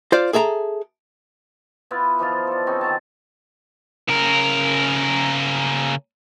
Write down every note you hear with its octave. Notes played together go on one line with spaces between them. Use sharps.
F4 C5 D5
G#4 A4 E5 A#5
B3 E4 F4 B4
E3 F3 D#4 F4
A4 D5
C#3 C4 C#4 D#4
D#3 F#3 C5 A5
C#3 A#4